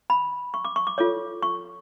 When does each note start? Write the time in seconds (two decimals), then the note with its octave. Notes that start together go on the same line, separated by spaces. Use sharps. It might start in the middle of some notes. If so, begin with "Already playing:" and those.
0.10 B5
0.54 C#6
0.65 D6
0.76 C#6
0.87 D6
0.98 F4 A4 C#5 D6
1.43 C#6